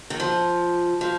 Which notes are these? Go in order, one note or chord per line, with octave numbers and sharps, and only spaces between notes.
D#3
F3
F3